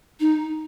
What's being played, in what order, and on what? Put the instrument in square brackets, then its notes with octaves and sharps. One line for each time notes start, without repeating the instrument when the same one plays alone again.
[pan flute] D#4